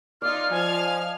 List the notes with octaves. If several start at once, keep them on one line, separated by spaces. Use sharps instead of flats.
D#4 F4 D5 D#5 F6
F3 F5 G#5 F6 G#6